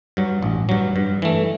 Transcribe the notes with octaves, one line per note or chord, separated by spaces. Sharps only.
G2 F#3
A1
G2 F#3
G2
E3 A3